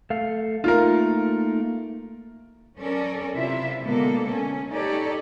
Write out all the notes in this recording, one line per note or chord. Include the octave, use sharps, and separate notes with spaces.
A3 A4 F5
A3 A#3 D#4 F4 A#4
F#2 C#4 A4 A#4 D5
C3 E4 F4 E5
B2 D3 G#3 A#3 A4
C#4
D#4 G4 A4 C#5 D5